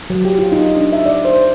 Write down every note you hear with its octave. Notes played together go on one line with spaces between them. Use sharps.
F#3
G4
F4
D#4
D4
E5
D5
C5